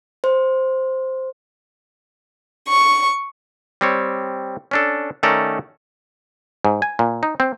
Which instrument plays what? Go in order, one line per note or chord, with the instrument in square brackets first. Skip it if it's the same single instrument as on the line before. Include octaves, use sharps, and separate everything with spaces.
[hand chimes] C5
[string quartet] C#6
[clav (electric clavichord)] G3 C4 C#5
C#4 D4 A4
D#3 A3 C#4 A4 D5 A#5
G#2
G#5
A#2
D#4
C4